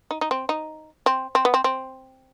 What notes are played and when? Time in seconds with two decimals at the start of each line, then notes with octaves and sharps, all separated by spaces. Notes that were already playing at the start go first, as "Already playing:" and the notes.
0.11 D#4
0.21 D#4
0.31 C4
0.49 D#4
1.06 C4
1.35 C4
1.45 B3
1.54 C4
1.64 C4